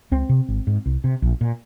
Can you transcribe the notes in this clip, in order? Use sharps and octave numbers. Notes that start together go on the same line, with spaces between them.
C#2 C4
C3
G#1
G#2
C2
C3
A#1
A#2